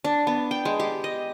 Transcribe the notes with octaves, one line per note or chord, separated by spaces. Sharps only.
D4
B3
G5
G#3
G4
D#5